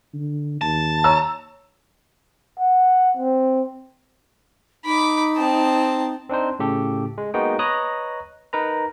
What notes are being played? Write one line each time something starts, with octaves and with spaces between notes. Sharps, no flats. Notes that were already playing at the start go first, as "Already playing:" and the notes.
D3
D#2 A5
C#5 A#5 E6
F#5
C4
D#4 B5 D6
C4 A5
C4 D4 D#4 C5
A2 C#3 G4 A4
G#3
G#3 A#3 B3 D#4 F#4 G5
B4 C#5 D#5 A#5 D#6 F#6
D#4 A#4 B4 A#5